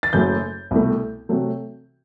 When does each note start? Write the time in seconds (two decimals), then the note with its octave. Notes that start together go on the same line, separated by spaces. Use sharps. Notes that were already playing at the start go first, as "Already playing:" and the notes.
0.03 A6
0.13 F#1 F#2 F#3 A3 G6
0.71 C2 B2 A3
1.29 C3 F#3 A3